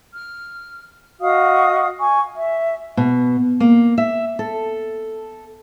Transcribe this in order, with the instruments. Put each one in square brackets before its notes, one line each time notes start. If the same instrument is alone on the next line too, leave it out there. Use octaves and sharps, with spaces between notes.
[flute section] F6
F#4 D#5 F5 D#6
G#5 C#6
E5
[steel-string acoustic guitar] B2
A#3
E5
A4